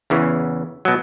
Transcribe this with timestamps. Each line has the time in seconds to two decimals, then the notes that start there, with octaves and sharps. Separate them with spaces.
0.10 E2 C#3 E3
0.85 B2 F#3